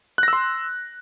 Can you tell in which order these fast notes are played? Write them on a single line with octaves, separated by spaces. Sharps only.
F#6 A#6 E6 C6